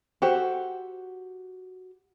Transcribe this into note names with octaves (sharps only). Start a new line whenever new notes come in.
F#4 G4 A4 C5